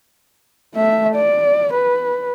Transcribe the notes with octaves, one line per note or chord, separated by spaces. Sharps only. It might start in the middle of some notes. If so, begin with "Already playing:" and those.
A3 E5
D5
B4